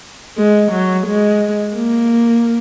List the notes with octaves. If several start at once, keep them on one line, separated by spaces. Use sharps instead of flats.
G#3
F#3
G#3
A#3